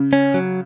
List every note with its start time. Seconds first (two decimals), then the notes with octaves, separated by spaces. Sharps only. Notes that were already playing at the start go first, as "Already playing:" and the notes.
Already playing: C#3
0.13 C#4
0.34 F#3